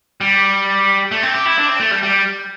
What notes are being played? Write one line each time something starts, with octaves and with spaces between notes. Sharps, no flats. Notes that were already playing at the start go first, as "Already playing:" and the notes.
G3
A3
C4
G4
E4
D4
C4
A3
G3
G3